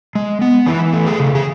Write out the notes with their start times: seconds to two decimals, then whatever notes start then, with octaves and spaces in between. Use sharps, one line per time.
0.15 G#3
0.42 B3
0.66 E3 E4
0.93 A3
1.07 G#4
1.20 C#3
1.35 G#4